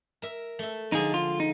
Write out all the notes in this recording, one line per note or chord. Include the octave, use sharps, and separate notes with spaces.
A#4 E5
A3 E5
D3 F3 G#3 D#4 G#4
F4
D#4